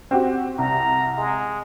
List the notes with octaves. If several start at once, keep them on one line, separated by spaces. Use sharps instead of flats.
C4 F#4 G4
C2 A#5
G#3